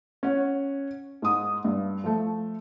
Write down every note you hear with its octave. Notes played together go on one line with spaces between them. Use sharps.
C#4 F#5
G#2 D#6
G2
F3 A3